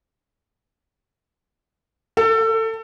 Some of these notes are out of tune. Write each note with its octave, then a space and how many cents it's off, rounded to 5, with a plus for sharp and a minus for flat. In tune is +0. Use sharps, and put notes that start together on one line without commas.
A4 +25